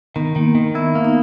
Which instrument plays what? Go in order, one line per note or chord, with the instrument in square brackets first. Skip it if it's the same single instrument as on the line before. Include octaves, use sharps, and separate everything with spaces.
[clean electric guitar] D#3 [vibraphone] B3
[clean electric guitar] D#3 [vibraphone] A#3
[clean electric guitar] D#3
[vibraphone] B3 [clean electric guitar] E4
[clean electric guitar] A#3
[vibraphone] D#4